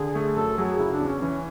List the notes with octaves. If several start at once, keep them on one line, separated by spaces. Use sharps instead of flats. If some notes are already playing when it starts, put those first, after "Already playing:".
Already playing: D3 G#4
A3
F#2 A4
F#3 G#4
C#3 E4
D4
E2
C#4
E3 C#4